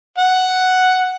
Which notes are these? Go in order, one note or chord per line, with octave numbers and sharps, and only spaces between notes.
F#5